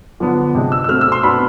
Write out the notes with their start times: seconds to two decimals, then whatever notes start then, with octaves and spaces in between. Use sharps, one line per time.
0.20 D3 F3 B3 D4
0.55 C3 G#3 D4
0.72 E6
0.84 E6
0.89 B2 A3 C4 F6
1.01 E6
1.12 C6
1.23 B2 B3 D4 B5